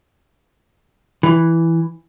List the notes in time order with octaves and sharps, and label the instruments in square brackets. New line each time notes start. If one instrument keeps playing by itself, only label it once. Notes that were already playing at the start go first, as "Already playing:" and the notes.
[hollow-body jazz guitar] E3